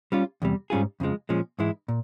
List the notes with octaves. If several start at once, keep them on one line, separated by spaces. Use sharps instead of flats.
G3 C#4 F4
E2 C3 G3
G#2 G3 C#4 F4 G#4
F2 C#3 F3 G#3
A#2 F3 G#3 C#4
G#2 E3 G#3 E4
A#2